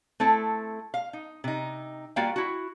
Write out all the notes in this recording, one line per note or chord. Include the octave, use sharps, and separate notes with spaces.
A3 C4 E4 A4
F5
D#4
C3 D#4
G3 A#3 F4 F#4 F5 G5
E4 F#4